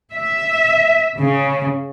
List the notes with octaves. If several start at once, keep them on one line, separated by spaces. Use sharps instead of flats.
E5
C#3